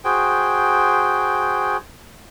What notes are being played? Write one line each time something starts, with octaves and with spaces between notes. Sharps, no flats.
F#4 G#4 C5 G5